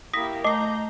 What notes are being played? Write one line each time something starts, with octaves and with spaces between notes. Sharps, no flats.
A#3 E4 G4 D#6 A#6 B6
A3 D#5 A#5 D6 G6 C7